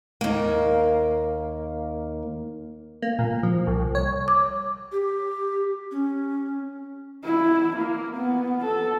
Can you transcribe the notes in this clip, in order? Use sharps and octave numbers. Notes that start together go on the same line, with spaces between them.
D#2 A#3
A#3
A#2
F3
C2
C#5
D6
G4
C#4
E4
A#3
B3
A4